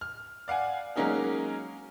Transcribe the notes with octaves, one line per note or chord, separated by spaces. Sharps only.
F6
D5 F5 F#5 G#5
F#3 G#3 A#3 C#4 D#4 G#4